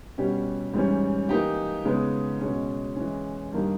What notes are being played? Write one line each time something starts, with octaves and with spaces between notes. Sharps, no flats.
B2 G3 C#4 G4
G#2 E3 G3 C#4
E3 A#3 D#4 G4
C#3 G#3 B3 D#4
B2 G#3 C#4
E3 G#3 C#4
G2 D#3 A#3 D#4 G4